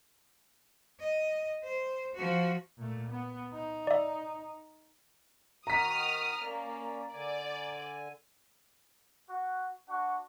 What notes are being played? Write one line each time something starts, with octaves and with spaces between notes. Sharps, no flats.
D#5
C5
F3 F#4
A#2 A3
B3
D#4
D5 E5
D#3 F#4 A#5 D#6 F6 B6
A#3 C#4 D5
D3 D5 G#5
F#4
D4 F#4 F#5 C#6